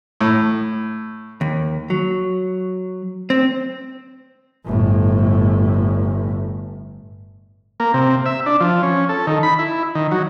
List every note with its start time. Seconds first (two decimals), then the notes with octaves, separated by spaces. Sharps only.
0.21 A2
1.41 D#2
1.90 F#3
3.30 C4
4.65 G1 A2
7.80 A#3
7.94 C3
8.26 E5
8.46 D4
8.60 F3
8.83 C#4
9.09 A4
9.27 D#3
9.43 B5
9.59 E4
9.95 D#3
10.11 F#3